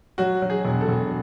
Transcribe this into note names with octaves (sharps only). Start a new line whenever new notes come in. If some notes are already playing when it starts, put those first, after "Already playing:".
F#3 F#4
F#3
G#4
E1
A4
E1